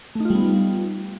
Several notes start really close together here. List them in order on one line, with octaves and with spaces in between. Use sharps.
A3 D#4 F4 G3 B3